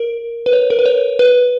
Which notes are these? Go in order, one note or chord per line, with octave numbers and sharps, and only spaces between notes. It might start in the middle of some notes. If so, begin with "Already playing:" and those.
Already playing: A#4
B4
C#5
A#4
B4
C#5
B4